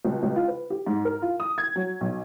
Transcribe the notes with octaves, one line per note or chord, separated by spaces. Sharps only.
C#2
C#2
F4
B4
G4
G#2
A#4
F4
D#6
G#6
F#3
B1